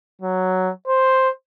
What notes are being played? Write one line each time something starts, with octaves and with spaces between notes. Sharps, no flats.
F#3
C5